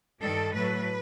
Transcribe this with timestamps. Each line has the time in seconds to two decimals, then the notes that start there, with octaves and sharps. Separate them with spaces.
0.20 G2 D#3 G3 A4
0.53 A2 F#3 A3 B4